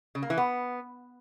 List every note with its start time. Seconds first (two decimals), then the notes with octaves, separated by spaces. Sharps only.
0.15 C#3
0.23 A#3
0.30 E3
0.38 B3